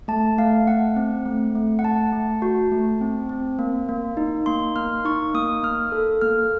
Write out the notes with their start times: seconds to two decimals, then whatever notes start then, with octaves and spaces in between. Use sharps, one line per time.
0.08 A3 A5
0.38 A3 F5
0.67 A3 F#5
0.96 C4
1.26 A3
1.55 A3
1.79 F#5
1.84 A3 A5
2.12 A3
2.42 F#4
2.72 A3
3.01 C4
3.29 C4
3.59 A#3
3.89 A#3
4.17 D#4
4.46 A#3 C6
4.76 A#3 F6
5.05 D#4 C#6
5.34 A#3 D#6
5.63 A#3 F6
5.92 A4
6.21 A#3 F6